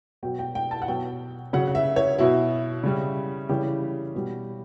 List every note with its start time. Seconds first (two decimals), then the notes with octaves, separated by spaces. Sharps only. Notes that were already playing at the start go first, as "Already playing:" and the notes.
0.23 B2 F#3 G5
0.39 G5
0.55 G5
0.71 A5
0.82 F#5
0.88 B2 F#3 G5
1.53 C#3 F#3 F#5
1.67 F#5
1.75 E5
1.96 C#5
2.19 B2 F#3 E4
2.83 C#3 G3
3.49 C#3 E3 G3 G4
4.14 B2 G3